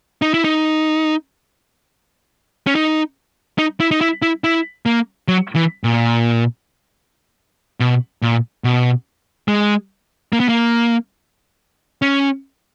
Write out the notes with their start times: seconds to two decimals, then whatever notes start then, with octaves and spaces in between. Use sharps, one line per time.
0.22 D#4
0.34 E4
0.44 D#4
2.67 C#4
2.75 D#4
3.59 D#4
3.80 E4
3.91 D#4
4.01 E4
4.22 E4
4.44 E4
4.86 A#3
5.28 F#3
5.55 E3
5.84 A#2
7.80 B2
8.22 A#2
8.64 B2
9.48 G#3
10.33 A#3
10.40 B3
10.49 A#3
12.02 C#4